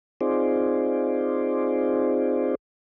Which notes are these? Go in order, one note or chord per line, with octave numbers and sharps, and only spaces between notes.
C4 D#4 F4 G#4 C5 D5